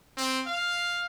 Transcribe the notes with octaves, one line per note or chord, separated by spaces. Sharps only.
C4
F5